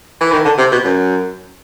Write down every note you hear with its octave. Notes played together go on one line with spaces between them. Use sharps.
E3
D#3
D3
C3
B2
F#2